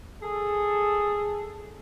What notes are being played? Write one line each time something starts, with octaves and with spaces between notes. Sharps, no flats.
G#4 A4